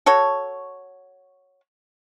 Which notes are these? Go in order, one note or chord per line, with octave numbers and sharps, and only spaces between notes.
F#4 A4 C#5